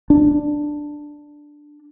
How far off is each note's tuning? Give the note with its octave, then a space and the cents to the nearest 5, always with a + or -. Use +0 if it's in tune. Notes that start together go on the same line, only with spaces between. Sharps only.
D4 +5